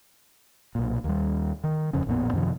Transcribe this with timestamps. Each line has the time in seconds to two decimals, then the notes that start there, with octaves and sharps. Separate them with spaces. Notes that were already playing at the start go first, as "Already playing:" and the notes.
0.75 B1 A#2
1.04 D#2 G3
1.64 D#3
1.93 D1 F2 C#3 C#4
2.06 A1 F2 A#2 B3
2.33 F#2 C3 D#3 F3